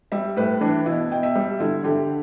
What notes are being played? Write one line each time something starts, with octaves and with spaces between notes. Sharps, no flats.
G3 E5
A2 B4
E3 D4
B2 E4
B2 G5
E5
G3
D3 E4
D3 G4